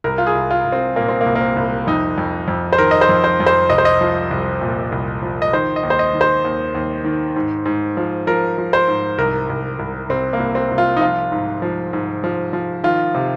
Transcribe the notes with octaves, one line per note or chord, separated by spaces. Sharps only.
C2 A#4
F4
G#4
C2
F4
C2
C4
A#2 A#3
C4
A#3
C2
A#3
C4
C2
F2 D#4
F2
F2
C5
D#3 A#4
D#5
C5
F2
C5
F2
C5
C2 D#5
C5
D#5
F3
C2
A#2
C2
F3
D#5
D#3 C5
D#5
D#2
C5
D#5
D#3
C5
D#2
D#2
D#3
G#2
G#2
F3
F3 A#4
F3
C5
G#2
C2 A#4
C2
C2
C2 C4
A#3
C2
C4
C2
F4
D#4
F3 F4
G#2
F3
G#2
F3
F3
D#3 F4
C3